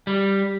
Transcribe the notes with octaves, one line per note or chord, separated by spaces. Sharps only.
G3